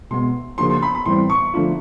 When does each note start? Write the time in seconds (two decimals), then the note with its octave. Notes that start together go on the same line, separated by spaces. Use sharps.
0.11 B2 G#3 B3 C6
0.58 C#3 F3 A#3 D4 F#4 C6
0.70 C6
0.82 B5
0.95 B5
1.05 A2 E3 G3 C4 C6
1.30 C#6
1.54 D3 F3 A3 D4 F4